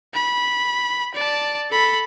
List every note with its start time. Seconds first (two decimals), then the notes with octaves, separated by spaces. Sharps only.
0.15 B5
1.15 D5 A5
1.71 A4 B5